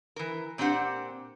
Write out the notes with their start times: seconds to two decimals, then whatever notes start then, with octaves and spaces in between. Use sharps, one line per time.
0.16 E3 A#4
0.58 A#2 C4 D4 G4 F#5